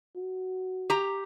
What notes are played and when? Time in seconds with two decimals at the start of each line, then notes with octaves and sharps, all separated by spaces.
0.16 F#4
0.90 G4 A#5